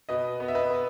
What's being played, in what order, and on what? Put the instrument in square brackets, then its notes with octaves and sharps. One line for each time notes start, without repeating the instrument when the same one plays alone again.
[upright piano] B2 B4 D#5
B3
E5
B4 D#5
B3